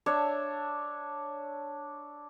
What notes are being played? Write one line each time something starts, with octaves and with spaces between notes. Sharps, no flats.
D4 C#5 E5